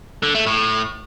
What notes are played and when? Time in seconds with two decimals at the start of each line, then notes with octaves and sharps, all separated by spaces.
0.23 D3
0.35 A3
0.47 A2